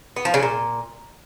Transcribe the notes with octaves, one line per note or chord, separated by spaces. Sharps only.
B3
F3
C#3
A#2